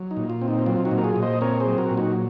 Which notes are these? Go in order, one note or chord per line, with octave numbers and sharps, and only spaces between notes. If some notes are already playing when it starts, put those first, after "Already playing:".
Already playing: F#3
D#4
A#2
F4
C4
D#4
F#3 F4
D#4 F#4
A#2
A#4
F4 G#4
A#2
C5 D#5
C4 A#4 C#5
G#4 C5
F#3
F#4 A#4
A#2
D#4 F#4